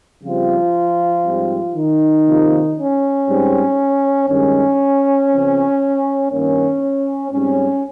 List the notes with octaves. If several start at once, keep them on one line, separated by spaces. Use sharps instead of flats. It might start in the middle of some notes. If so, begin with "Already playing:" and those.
C#3 F3 G3 C4 F4
G#2 G3 C4
D#3 D#4
C3 F3 A#3
C#4
G#2 G3 C4
G2 D#3 G#3 C#4
C#3 F3 C4
G2 D#3 A#3 C#4
G#2 G3 C4 C#4